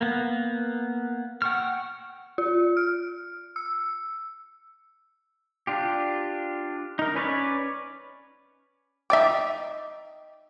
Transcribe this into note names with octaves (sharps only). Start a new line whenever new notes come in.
A#3 B3
F#5 G5 C#6 E6 F6
F4
F6
E6
D4 F4 G4
D#4 A#4
C#4 B4 C#5 D5
D#4 D5 E5 G5 D6